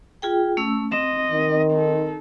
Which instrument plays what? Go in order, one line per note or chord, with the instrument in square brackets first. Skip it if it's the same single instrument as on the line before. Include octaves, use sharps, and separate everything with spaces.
[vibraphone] F4 G#4 G5
A3 C#4 E6
[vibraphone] C4 [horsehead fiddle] D#5
[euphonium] D#3
[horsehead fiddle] D#4 A4